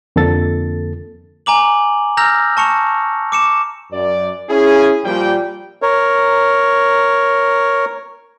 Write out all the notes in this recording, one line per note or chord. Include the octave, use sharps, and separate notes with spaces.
F2 D3 A#3 A4 A6
G#5 A#5 D6 F#7
A#5 E6 F6 G6 A#6 F7
A5 C#6 C#7 F7
D6 C#7 E7
F#2 D5
C#4 E4 G#4
A#2 F3 G3 G5
A#4 C#5